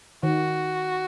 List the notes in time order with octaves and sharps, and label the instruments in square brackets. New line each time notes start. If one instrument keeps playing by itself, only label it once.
[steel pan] D#3 [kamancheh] F#4